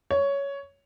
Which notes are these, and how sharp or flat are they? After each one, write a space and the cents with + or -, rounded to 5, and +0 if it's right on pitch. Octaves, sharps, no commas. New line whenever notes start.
C#5 +10